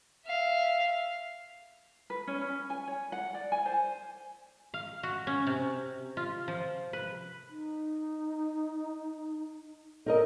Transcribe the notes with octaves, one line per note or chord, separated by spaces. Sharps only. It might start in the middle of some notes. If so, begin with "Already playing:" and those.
E5 F5
B4
C#4
C#4
G#5
C#5
F#5
D5
G#5
C5
F5
F#4
C#4
C3
F4
F3
B4
D#4
D#4 A4 A#4 D#5